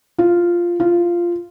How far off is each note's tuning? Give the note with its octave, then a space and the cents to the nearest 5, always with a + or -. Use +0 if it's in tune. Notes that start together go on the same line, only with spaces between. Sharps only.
F4 -5
F4 -10